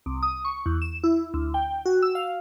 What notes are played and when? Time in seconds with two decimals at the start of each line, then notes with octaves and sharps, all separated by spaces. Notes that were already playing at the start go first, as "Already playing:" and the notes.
0.06 C2
0.23 D#6
0.45 C#6
0.66 E2
0.82 E7
1.04 E4
1.34 D2
1.54 G5
1.86 F#4
2.02 E6
2.15 F5